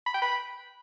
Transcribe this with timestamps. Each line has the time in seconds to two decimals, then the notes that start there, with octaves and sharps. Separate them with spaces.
0.06 B5
0.14 G5
0.22 B5